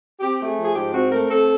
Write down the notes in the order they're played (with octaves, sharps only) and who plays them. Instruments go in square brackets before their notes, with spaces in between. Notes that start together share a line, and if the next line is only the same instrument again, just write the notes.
[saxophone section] C4 G4
A3 G4
G#4
F3
G#4
G#2 G4
C4 F#4
A3 A#4
C4 A4